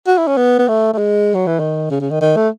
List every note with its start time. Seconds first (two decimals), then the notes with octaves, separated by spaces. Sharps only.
0.07 F#4
0.18 E4
0.27 C#4
0.37 B3
0.59 B3
0.68 A3
0.93 A3
0.98 G#3
1.34 F#3
1.47 E3
1.59 D#3
1.90 C#3
2.01 C#3
2.10 D#3
2.21 D#3
2.36 A3